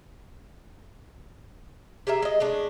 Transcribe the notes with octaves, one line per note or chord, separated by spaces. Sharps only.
G4 G#4 A#4 E5
G#3 D#5
G#3 A3 D4